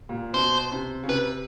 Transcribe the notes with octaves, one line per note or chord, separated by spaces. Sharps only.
A#2
B2 C5
C3
C#3
C3 B4